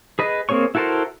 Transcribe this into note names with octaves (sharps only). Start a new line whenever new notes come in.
G#4 B4 D#5
A#3 C4 G#4 C#5 C#6
E4 F#4 A4 A#4 C5